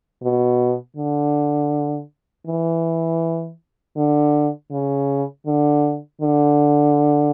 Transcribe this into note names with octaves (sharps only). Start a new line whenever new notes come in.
B2
D3
E3
D3
C#3
D3
D3